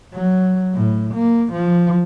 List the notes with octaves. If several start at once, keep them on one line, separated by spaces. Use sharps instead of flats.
F#3
A2
A#3
F3